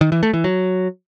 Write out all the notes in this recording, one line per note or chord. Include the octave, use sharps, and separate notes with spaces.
D#3
E3
A3
E3
F#3